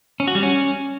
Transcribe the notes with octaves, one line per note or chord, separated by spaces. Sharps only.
C#4
F#4
G3
C#4